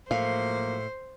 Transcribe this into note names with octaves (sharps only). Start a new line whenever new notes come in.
A2 F3 F#3 A#3 C5 F5